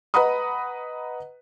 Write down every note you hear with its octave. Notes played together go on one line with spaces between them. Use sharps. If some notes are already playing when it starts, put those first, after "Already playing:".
B4 D#5 F#5 A#5 B5 D#6